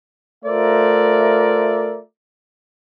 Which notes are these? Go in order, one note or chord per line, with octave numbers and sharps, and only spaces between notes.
A3 F4 A#4 C5 D5 E5